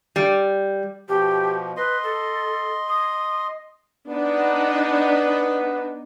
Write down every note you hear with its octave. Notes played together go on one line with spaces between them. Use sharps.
G3
B2 F3 G4
B4 D#5 C6
A4
D#6
B3 D4 D#4